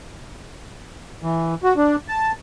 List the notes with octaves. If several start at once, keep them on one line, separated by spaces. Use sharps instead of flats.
E3
F#4
D4
A5